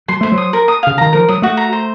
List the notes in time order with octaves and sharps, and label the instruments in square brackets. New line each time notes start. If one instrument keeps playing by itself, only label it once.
[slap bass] F#3 [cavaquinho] C6
[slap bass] A3 [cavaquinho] C5
[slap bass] F#3
[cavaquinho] D#6
A#4
D#6
[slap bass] C#3 [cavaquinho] F5
[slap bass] D#3 [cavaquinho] A#5
[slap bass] F3 [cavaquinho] A#4
[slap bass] F#3 [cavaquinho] D#6
[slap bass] A3 [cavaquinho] F#4
[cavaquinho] A#5
C5